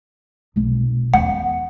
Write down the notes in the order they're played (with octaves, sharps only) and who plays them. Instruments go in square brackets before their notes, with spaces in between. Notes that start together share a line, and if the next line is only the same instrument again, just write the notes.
[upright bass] F1 B1
[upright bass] E2 C#4 [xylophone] F#5